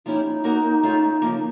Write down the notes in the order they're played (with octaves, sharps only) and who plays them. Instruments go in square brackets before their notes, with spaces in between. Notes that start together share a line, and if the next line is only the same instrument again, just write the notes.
[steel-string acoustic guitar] F3 A#3 C#4 E4 G4 [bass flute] D#4
[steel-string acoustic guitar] A#3 C#4 F#4 A#4 D#5
A3 C#4 F4
C#3 F3 A#3